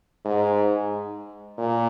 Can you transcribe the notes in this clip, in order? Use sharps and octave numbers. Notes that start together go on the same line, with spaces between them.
G#2
A#2